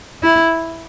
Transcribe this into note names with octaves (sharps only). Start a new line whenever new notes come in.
E4